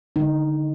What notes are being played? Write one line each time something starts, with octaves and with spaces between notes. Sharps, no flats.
D3 G#3 D#4